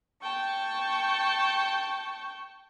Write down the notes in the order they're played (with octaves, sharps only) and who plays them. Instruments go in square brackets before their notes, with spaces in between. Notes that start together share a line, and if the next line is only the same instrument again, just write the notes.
[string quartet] G5 A5 C#6